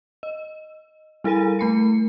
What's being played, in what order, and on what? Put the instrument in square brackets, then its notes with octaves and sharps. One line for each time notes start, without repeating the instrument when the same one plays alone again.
[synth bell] D#5
G3 E4 A4 A#4 G#5 D#7
A3 B5 C#7